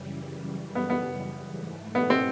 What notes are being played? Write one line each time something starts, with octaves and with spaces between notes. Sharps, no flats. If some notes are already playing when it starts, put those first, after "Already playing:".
Already playing: F#2 C#3 E3 G3
B3
B3
G#2 E3 A3
B3
C4